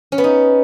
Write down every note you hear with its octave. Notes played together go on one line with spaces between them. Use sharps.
C#4
B3
D#4